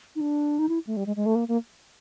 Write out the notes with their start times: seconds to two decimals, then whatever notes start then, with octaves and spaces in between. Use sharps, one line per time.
0.15 D#4
0.21 D4
0.59 D#4
0.69 E4
0.87 A3
0.97 G3
1.06 G#3
1.16 G#3
1.26 A3
1.35 A#3
1.48 A#3